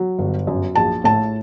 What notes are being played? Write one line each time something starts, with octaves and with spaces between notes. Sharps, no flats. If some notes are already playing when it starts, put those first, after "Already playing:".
Already playing: F#3
G1
F#2
A#1 A5
A2 A5